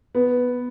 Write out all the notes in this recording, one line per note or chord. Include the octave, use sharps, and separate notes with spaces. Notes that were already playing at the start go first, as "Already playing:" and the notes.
B3